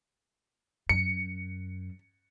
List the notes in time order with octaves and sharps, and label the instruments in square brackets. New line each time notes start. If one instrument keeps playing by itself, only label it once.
[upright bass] F#2 [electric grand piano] C#7